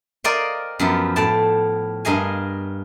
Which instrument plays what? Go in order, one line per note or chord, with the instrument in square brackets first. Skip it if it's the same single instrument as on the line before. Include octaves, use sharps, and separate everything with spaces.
[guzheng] A#4 C5 D5 D#5 F5 G5
F#2 F3 B3
A2 G5 A5
G2 A#4 D#5 F5 G#5